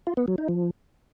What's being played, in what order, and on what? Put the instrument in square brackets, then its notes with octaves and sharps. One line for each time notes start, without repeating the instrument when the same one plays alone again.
[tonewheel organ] F4
B3
F#3
D#4
F3